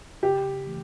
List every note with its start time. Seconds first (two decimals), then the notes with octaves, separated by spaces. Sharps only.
0.22 C#3 G4
0.67 E3 A3